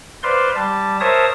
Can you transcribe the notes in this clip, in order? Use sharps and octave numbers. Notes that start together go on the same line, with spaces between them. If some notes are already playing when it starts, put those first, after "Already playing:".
B4 C5 D5 F5 C6
G3 A5
A#4 C5 C#5 E5 A5 D#6